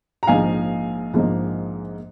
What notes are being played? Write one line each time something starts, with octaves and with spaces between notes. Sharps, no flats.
A#5
A#1 G#2 F3 A#3 D#4 F5 G#5
A#1 G#2 F3 A#3 D#4